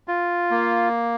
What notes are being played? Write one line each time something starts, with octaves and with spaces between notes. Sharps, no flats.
F4
A#3